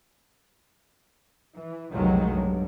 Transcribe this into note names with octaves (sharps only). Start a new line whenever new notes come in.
E3
F1 B1 A#2 D#3 F#3 G#3
G2